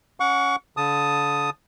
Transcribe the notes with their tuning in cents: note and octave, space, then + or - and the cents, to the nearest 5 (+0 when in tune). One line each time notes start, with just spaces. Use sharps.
C#4 +0 F#5 -20 C#6 +30
D3 -40 A5 +0 D#6 +0